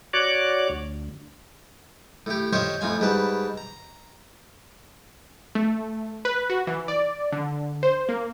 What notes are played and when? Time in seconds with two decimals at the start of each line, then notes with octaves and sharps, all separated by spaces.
0.13 F#4 C#5 D5 D6
0.70 D2
2.26 A2 G4
2.53 F4 G4 C5 C#5 D#5 E5
2.81 F2 A2 F4 G#5
3.00 G#2 G3 B4 A5
3.57 A#5
5.55 A3
6.25 B4
6.50 F#4
6.67 E3
6.88 D5
7.32 D3
7.83 C5
8.09 A#3